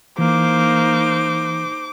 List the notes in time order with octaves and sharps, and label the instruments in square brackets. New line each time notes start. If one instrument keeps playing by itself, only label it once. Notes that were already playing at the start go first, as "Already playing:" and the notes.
[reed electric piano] E3 [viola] A#3 [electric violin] D#4 C5 [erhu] D6